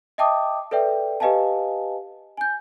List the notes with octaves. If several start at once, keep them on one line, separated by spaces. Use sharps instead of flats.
D#5 E5 G5 A5 D6 D#6
A4 B4 D5 E5 G5
G4 B4 D#5 F5 G#5 A5
G#5 G6